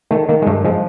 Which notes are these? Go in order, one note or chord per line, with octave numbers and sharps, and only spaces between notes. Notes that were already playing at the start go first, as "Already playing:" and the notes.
D#3 A3
D#3 A#3
G#3
G2 A3
F3 G#3